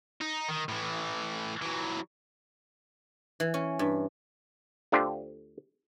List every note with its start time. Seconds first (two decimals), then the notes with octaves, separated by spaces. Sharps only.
0.21 D#4
0.48 D#3
0.69 A2 E3
1.62 E3 F#3
3.40 E3
3.54 C#4
3.79 G2
4.92 D2 D3 D4 F4 G4 C5